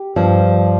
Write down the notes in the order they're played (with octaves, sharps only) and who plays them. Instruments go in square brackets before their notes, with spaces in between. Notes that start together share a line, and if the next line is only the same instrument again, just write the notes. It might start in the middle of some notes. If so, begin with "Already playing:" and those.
Already playing: [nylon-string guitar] G4
G2 F3 C4